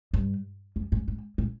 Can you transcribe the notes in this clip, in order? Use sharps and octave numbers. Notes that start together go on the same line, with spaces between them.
G2
F2
G#2
G#2
A2